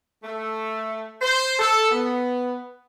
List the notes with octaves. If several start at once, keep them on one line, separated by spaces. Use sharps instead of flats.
A3
C5
A4
B3